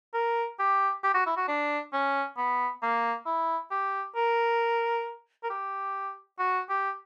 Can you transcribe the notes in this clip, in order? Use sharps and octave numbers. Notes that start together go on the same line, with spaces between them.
A#4
G4
G4
F#4
E4
F#4
D4
C#4
B3
A#3
E4
G4
A#4
A#4
G4
F#4
G4